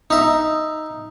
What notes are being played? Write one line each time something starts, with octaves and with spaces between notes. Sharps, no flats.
D#4 E5